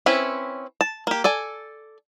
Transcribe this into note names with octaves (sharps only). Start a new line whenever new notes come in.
C4 C#4 E4 B4
A5
A#3 G4
A4 D5 G#5